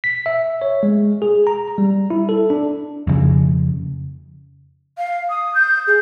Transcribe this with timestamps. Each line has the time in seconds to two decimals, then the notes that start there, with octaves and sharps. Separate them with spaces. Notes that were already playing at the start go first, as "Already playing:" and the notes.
0.04 B6
0.26 E5
0.62 C#5
0.83 G#3
1.22 G#4
1.47 A#5
1.78 G3
2.10 E4
2.29 A4
2.50 D4
3.07 F2 C#3
4.97 F5
5.29 D#6
5.54 G6
5.87 G#4